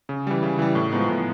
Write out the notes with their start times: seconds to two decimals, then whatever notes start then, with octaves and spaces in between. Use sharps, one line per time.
0.09 C#3
0.27 E3 G3
0.43 C#3
0.59 E3 G3
0.75 A2
0.92 F3 G#3 B3 D#4
1.09 A2